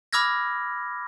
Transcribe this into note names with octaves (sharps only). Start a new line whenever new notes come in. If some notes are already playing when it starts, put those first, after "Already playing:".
B5 D6 E6 F6 G#6 A#6